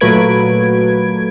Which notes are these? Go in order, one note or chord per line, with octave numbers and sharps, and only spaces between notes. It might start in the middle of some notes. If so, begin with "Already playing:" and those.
A#2 F#3 A3 B4 G#6 D7